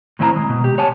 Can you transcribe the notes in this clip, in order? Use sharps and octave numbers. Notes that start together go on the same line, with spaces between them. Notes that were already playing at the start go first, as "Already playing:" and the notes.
A2 D#3 C4 E4 G5 A#5
G#3
B2
G4
C#5 F#5 G#5 A5